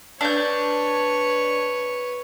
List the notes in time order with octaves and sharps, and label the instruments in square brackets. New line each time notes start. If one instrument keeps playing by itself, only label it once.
[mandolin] D4 G6 [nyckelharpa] B4 C#5